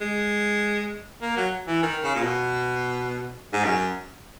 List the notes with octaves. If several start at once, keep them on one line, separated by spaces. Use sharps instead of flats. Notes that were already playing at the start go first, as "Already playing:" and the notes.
G#3
A#3
F#3
E3
D#3
C#3
A#2
B2
G#2
F#2